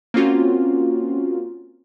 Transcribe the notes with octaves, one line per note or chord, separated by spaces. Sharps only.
A#3 C4 C#4 F4 F#4